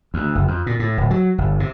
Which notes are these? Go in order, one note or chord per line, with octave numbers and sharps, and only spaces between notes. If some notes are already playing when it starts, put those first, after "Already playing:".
D2
F#1
F2
A#2
A2
D1
F#3
G1
C3